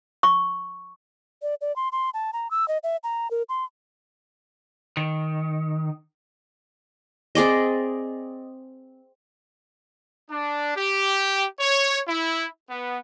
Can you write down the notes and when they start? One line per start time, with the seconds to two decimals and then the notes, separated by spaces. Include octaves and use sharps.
0.23 C#6
1.42 D5
1.61 D5
1.76 C6
1.92 C6
2.14 A5
2.33 A#5
2.51 E6
2.68 D#5
2.83 E5
3.04 A#5
3.31 A#4
3.49 C6
4.97 D#3
7.35 C4 G#4 D5 D#5
10.29 D4
10.75 G4
11.60 C#5
12.07 E4
12.70 B3